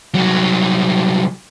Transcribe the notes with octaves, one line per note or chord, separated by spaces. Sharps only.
C2 F#3